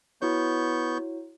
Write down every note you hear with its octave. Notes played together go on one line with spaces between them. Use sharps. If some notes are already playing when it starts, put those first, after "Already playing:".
B3 E4 F#4 C#5 C#6 G6